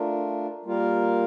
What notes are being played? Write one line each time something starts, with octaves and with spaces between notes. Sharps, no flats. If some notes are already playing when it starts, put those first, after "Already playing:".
Already playing: A3 D4 F4 A#4
G3 A#3 F4 A#4 F5